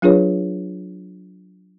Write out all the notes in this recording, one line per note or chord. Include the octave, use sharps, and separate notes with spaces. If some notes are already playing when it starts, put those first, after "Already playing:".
F#3 D4 F4 G#4 B4 C#5